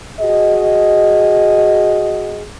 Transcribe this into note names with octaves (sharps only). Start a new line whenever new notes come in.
F#4 G#4 D#5